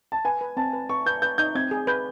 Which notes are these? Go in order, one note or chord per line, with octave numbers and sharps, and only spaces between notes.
A5
B4 G#5
B4
C4 A5
B4
B4 C#6
B4 G6
B4 G6
D#4 G6
C4 G#6
G#4
B4 G6